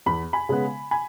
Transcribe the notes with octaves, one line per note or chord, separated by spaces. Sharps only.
E2 B5
G#5 B5
C#3 G#3 B3
G#5 B5